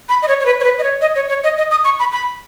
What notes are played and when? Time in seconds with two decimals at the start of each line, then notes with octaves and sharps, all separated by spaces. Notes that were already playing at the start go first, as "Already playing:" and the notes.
0.09 B5
0.22 D#5
0.28 C#5
0.40 C#5
0.46 B4
0.60 C#5
0.64 B4
0.79 D#5
0.83 C#5
1.01 D#5
1.16 C#5
1.29 C#5
1.44 D#5
1.58 D#5
1.71 D#6
1.84 C#6
1.99 B5
2.12 B5